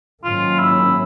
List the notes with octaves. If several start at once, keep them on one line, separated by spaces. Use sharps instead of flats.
G#2 D#3 F#3 A#3 C#4 F4
E4